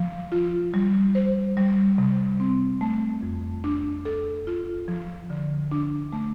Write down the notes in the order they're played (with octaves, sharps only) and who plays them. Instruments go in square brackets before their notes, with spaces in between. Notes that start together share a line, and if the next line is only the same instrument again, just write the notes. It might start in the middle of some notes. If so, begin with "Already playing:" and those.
Already playing: [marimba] F3
F4
G3
C5
G3
C3
C4
A3
F2
D4
A4
F4
F3
D3
D4
A3